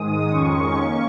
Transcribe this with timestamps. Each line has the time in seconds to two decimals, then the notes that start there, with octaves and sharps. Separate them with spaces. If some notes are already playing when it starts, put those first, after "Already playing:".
Already playing: G#2 D#3 G#3 D#6
0.30 F2 D#3 G#3 C#4 C#6
0.78 A#3 C#4 C#6